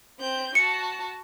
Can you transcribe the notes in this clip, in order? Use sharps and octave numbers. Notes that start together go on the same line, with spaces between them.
C4 G6
F#4 A5 C#7